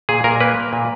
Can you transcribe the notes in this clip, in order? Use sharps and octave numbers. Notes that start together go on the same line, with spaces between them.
A#2 G#4
A#2 A#4
A#3 B4
A#3
A#2